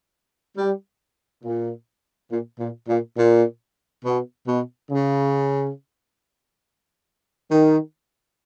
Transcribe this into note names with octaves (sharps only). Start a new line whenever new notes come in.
G3
A#2
A#2
A#2
A#2
A#2
B2
B2
C#3
D#3